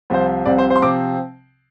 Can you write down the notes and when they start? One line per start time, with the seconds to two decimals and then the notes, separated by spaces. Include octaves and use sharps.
0.10 C2 C3 F3 C4 C5
0.46 C2 C3 F3 C4 D5
0.58 C5
0.70 C5
0.76 C6
0.82 C3 F3 C4 D6